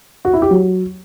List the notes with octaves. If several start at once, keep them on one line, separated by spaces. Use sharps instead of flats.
F#4
E4
G4
F#3